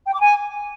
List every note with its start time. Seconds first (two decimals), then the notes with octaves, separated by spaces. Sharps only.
0.07 G5
0.13 D6
0.20 G#5